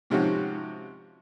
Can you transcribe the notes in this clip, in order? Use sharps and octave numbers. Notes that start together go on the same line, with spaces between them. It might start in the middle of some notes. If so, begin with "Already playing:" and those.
G#2 C3 F3 C#4 F#4